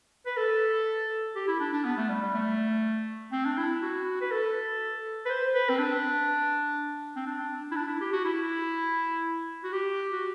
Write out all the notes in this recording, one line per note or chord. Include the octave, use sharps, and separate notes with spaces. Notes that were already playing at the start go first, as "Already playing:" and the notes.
B4
A4
G4
E4
D4
D4
B3
A3
G3
G3
A3
C4
D4
E4
F#4
B4
A4
B4
C5
B4
C4
D4
C4
D4
E4
D4
E4
G4
F#4
E4
F#4
G4
F#4